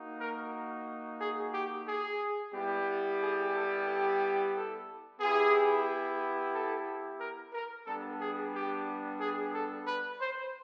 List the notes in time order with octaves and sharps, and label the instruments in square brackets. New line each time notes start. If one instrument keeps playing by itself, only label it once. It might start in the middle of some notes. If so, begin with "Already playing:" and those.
Already playing: [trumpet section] A#3 D#4 F#4
A#4
G#4
G4
G#4
G3 B3 E4 G4
G#4
A4
A4
A4
B3 E4 G4 G#4
A4
A#4
A#4
G3 B3 D4 A4
G#4
G4
G#4
A4
B4
C5